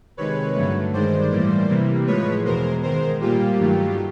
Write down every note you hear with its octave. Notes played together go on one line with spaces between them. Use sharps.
C3 D#3 G#3 B4 C#5
G2 D3 F#3 A3
G2 D#3 G#3 C5 D5
A2 E3 G3 A#3
C3 E3 G3 A#3
A2 F3 G#3 B4 C#5
E2 B2 G#3 A#4 C5
G#2 D#3 G#3 A#4 C5
A#2 G3 A#3 F4 G4
G2 D#3 F#3 A3